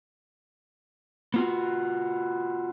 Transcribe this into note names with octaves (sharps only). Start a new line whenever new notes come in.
B3 F4 F#4